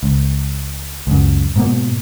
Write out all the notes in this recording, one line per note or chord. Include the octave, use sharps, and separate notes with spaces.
C#2
C#2 F#2
G#2 B2 A#3